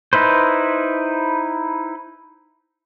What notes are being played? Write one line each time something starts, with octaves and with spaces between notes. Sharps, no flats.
D#4 E4 B4 C5